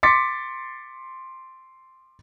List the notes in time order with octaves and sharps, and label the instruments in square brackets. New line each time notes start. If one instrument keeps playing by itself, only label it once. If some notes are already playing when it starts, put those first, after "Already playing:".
[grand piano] C6 D6 A6 B6 C#7